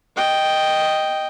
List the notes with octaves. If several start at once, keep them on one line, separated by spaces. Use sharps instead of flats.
D#5 G5